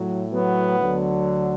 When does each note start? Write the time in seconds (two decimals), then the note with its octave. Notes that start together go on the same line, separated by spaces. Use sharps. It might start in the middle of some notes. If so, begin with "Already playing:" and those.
Already playing: A2 F#3
0.30 F#3 B3
0.79 D2 D3 F#3